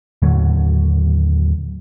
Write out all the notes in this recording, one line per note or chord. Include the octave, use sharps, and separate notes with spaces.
D#2 A2 D3 F#3